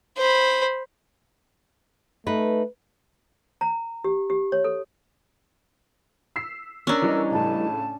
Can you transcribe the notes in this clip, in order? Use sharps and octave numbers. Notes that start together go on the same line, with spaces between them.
C5 B5
A3 D#4 B4
A#5
G4
G4
C#5
A4
E6 B6 C7
C#4 D4 A#4 A#5 C#6 E6
E3 G3 D#4
A2 C#3 A5